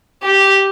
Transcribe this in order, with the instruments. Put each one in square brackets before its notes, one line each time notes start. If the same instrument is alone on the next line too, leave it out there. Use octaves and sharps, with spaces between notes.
[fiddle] G4